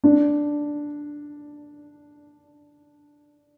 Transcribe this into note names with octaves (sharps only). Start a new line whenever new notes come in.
D4